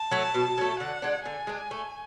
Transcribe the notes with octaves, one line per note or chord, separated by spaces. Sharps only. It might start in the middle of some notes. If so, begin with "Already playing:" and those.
Already playing: A5
F#3 A3
B2
F#3 A3
D3 F#5
G#3 D4
D3 G#5
G#3 D4
A3